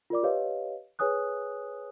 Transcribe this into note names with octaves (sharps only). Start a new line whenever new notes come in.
F4 A#4 D5 D6
G4 B4 C#5 D#5 F5
G#4 B4 C#5 G#5 D#6 F#6